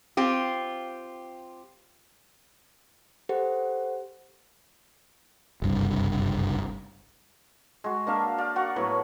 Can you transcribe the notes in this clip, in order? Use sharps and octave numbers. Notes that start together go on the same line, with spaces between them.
C4 F4 G4
G4 A4 C5 F#5
F#1 C2 G2
G#3 F#4
A#3 D4 E5 F5
D5 F5
F#4 A#4 F#5 C#6
A2 F#3 B3 B5